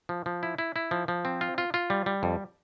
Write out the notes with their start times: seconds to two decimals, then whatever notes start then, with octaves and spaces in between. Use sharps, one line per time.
0.09 F3
0.26 F3
0.43 E4
0.58 E4
0.76 E4
0.91 F3
1.08 F3
1.25 C4
1.41 F4
1.58 F4
1.74 F4
1.90 G3
2.06 G3
2.23 F2